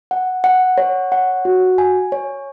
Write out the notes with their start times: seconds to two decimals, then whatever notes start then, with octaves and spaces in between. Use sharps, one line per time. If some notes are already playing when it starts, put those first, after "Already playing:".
0.11 F#5
0.44 F#5
0.78 C#5
1.12 F#5
1.45 F#4
1.78 G#5
2.12 C#5